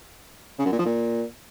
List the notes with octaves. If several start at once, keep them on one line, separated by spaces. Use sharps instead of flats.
C#3
F#2
A#2
F3
A#2